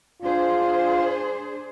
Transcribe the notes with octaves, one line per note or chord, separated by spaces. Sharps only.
D4 F4 G#4 C5